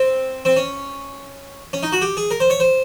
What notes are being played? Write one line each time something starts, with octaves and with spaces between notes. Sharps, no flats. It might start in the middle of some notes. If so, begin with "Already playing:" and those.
Already playing: C4
C4
C#4
C#4
D#4
F#4
G4
G#4
A#4
C5
C#5
C5